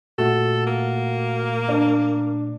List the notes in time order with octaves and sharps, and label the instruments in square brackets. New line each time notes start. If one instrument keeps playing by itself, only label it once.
[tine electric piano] A#2 A3 [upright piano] F#4 [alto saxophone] A4
[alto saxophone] A#3
[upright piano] D4